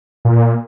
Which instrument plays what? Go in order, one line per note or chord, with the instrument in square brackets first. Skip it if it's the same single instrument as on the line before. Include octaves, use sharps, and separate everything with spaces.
[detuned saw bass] A#2